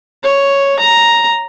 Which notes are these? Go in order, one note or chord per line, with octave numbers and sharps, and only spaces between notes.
C#5
A#5